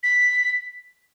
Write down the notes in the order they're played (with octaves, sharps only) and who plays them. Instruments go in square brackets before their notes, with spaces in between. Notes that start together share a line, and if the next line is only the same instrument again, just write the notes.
[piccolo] B6